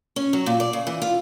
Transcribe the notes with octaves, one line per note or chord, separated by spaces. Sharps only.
C#4
F#3
A#2
D5
C#3
E3
F4